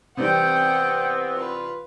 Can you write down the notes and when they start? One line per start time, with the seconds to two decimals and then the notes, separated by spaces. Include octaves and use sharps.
0.17 C3 E3 G3 B3 C4 F#5 G5
1.34 F4 B4